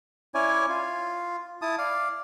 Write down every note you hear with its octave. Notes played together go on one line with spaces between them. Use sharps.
C#4 E4 C#5 D5 G#5
F4
E4 A5 D#6
D5 F5